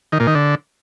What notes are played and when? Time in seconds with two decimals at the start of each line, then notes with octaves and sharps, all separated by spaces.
0.12 D#3
0.20 A#2
0.27 D#3
0.35 D3